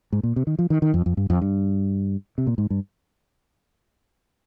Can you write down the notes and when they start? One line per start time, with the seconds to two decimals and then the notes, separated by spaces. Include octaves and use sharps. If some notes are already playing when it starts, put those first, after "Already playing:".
0.12 G#2
0.23 A#2
0.36 C3
0.47 D#3
0.59 F3
0.70 D#3
0.82 D#3
0.94 F2
1.06 F2
1.17 G2
1.30 F2
1.41 G2
2.38 C3
2.47 A#2
2.58 G#2
2.70 G2